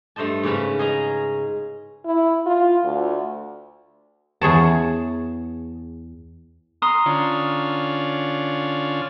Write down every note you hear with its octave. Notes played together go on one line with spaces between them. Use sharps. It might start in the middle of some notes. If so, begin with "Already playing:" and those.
G2 A3 C5 D#5 A5
G#2 C#3 C#4 B4
G#4 D#5 A#5
E4
F4
D2
E2 G#4 C#5 A5
A#5 C6 D#6
D3 C#4 F4